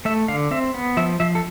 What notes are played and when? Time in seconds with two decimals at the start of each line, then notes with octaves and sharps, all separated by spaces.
0.05 A3 E5
0.28 D3 F5
0.51 C4 E5
0.74 B3
0.97 F3 E5
1.20 F3 E5
1.35 A4